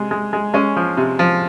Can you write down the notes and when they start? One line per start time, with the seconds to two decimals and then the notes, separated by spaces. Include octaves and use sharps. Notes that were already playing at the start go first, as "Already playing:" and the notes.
Already playing: C3 G#3
0.11 G#3
0.33 G#3
0.54 G#3 C#4
0.76 F3
0.97 C3
1.19 F3